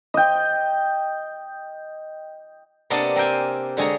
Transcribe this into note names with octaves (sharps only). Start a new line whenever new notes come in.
D#5 G5
C3 A#3 B3 D4 D#5 A5
C4 A#4 E5 G5 G#5
D3 G#3 G#4 C#5 A#5